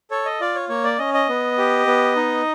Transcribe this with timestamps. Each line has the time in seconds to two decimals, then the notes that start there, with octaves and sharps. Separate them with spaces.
0.11 A4 C#5
0.25 D#5
0.40 F4 D5
0.55 C#5
0.69 A#3 C#5
0.84 D5
0.98 C#4 D#5
1.14 D#5
1.29 B3
1.58 G4
1.87 B3
2.16 D#4